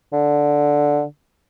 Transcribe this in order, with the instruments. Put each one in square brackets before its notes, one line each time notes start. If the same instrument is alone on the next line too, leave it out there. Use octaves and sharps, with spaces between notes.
[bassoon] D3